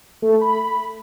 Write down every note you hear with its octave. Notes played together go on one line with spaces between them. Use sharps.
A3
B5